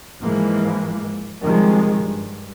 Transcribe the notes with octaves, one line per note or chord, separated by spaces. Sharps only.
G#2 E3 F3 G#3 A#3
C3 D#3 F3 G3 G#3
G2